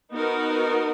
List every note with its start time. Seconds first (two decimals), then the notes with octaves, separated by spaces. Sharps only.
0.13 B3 D#4 F#4 A#4